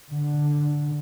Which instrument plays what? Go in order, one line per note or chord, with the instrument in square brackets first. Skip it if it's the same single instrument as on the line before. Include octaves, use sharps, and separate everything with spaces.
[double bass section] D3